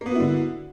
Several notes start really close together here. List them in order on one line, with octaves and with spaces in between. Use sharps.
A#3 B3 F#4 E4 D3